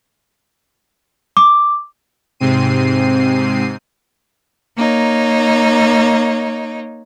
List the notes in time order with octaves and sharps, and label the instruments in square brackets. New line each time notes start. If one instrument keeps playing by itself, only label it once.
[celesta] D6
[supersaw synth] G#2 C3 C4 C7 D#7
[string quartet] A#3 D#4 C#5